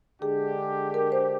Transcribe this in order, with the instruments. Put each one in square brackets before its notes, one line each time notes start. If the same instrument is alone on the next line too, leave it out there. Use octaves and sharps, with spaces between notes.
[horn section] D3 G#3 D4 G4 [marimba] G#4
[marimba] A#4
C5